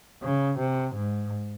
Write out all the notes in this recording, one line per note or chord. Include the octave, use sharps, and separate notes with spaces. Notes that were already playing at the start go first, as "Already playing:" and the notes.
C#3
C3
G#2